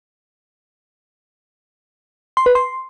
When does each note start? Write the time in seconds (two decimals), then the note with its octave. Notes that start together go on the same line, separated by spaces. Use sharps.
2.37 C6
2.46 B4
2.55 C6